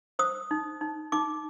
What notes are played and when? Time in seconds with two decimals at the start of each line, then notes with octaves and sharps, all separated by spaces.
0.19 C5 D#6
0.51 D#4
0.81 D#4
1.12 D#4 D6